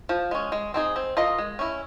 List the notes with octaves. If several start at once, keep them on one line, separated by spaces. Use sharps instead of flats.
F3
G#3 C#4
G#3
C4 D#4 G#4
C4
F4 A#4 D#5
G#3
C#4 E4